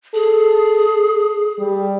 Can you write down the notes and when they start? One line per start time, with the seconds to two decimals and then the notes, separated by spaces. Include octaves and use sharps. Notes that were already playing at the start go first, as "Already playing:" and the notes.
0.15 G#4 A4
1.59 G3